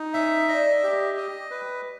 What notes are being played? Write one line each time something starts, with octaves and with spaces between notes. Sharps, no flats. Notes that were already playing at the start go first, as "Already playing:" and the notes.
Already playing: D#4
C#4 E5
D4 D#5
G4
D#5
B4